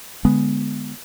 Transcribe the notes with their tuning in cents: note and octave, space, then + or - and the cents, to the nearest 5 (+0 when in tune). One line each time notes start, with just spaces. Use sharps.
D3 +0 G#3 +0 B3 +0